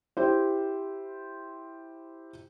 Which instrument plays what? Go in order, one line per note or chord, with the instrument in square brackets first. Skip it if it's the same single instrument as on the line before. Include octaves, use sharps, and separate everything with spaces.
[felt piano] E4 G4 C5